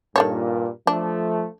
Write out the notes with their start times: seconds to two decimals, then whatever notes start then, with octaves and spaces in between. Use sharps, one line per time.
0.16 G2 A#2 D#3 A4 C#5
0.87 F3 A3 D4